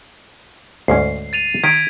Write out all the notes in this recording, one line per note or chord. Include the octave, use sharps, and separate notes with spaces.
D2 G#2 C#4 C7
A6 D#7 F7
D#3 G#6 B6 D7